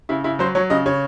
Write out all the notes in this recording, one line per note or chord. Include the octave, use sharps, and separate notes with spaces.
C#3 E4
C#3 E4
F#3 C5
F#3 C#5
C#3 D#5
C#3 C#5